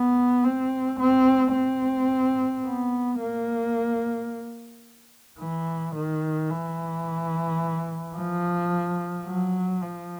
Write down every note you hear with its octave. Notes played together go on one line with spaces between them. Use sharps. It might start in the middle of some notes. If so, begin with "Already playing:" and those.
Already playing: B3
C4
C4
C4
B3
A#3
E3
D#3
E3
F3
F#3
F3